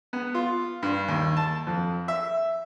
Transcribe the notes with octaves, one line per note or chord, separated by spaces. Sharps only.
B3
F4
G2
D#2
A5
F2
E5